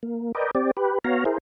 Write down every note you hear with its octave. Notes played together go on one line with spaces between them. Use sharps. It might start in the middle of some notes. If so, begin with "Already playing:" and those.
A#3
A#4 B4 D5 D#5 G5
C4 G4 D5
G4 B4
B3 F#4 C#5 F5 A#5
E4 G#4 A#4 C5